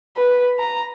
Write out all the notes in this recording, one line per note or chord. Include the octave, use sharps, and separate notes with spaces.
B4
A#5